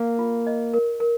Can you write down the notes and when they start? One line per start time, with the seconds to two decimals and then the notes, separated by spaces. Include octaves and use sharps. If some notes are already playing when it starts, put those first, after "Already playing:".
Already playing: A#3 F5
0.19 F4
0.47 D#5
0.73 A#4
1.00 A#4